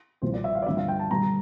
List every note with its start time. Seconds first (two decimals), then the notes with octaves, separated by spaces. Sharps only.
0.22 C2 A#2 F3 C5
0.34 D5
0.44 E5
0.55 F5
0.62 D5
0.66 G2 D3 F3 E5
0.77 F5
0.88 G5
0.99 A5
1.11 G2 D3 G3 A#5